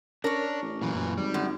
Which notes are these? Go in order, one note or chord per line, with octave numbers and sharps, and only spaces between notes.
C#4 D4 A#4 C#5
A1
F#2 A#2 E3
F#2
G#1 G3
F#2 D3